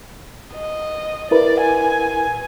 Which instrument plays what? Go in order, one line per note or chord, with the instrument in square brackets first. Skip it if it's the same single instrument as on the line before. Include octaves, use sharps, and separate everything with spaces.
[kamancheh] D#5
[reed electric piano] E4 A#4 B4 [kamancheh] D5
[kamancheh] G#5